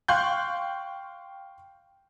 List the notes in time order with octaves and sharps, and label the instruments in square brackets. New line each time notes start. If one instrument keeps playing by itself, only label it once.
[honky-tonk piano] F5 G5 C6 C#6 F#6 G6